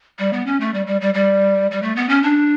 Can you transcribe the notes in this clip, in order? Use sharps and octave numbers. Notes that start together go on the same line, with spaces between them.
G3
B3
C#4
A3
G3
G3
G3
G3
G3
A3
B3
C#4
D4